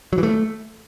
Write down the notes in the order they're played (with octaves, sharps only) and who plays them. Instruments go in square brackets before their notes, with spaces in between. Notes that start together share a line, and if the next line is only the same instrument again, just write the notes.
[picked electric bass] F#3
E3
A3